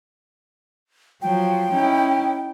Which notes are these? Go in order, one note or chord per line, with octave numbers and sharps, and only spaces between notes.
F3 F#3 G5
C#4 D#4 E4